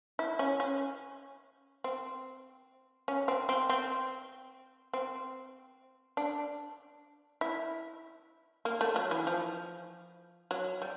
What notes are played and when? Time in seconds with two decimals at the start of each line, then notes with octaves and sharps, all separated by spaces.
0.19 E4
0.39 C#4
0.60 C#4
1.84 C4
3.08 C#4
3.28 C4
3.49 C4
3.69 C4
4.93 C4
6.17 D4
7.41 E4
8.65 A#3
8.81 A3
8.96 F#3
9.11 E3
9.27 F3
10.51 F#3
10.82 G3